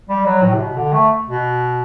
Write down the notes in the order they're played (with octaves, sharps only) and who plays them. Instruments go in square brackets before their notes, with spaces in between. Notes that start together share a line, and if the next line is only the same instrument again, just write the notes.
[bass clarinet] G3
F#3
A2
C3
B2
D3
A3
B2